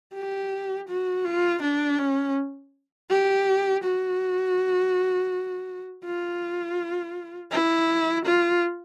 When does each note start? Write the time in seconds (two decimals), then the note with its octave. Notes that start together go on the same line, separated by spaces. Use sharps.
0.14 G4
0.89 F#4
1.25 F4
1.62 D4
1.99 C#4
3.10 G4
3.84 F#4
6.04 F4
7.52 E4
8.25 F4